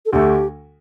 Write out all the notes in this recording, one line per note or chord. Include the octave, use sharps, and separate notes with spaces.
A4
D2 D3 A3 G4